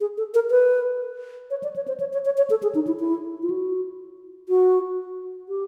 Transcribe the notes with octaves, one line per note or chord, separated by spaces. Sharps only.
G#4
A4
A#4
B4
C#5
D5
C#5
C5
C#5
C#5
C#5
C#5
A4
G#4
D#4
E4
E4
F4
F#4
F#4
G4